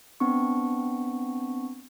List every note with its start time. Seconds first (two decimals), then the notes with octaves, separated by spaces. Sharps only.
0.20 B3 C4 D4 C#6